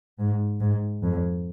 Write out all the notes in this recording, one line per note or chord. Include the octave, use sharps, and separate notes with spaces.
G#2
G#2
F2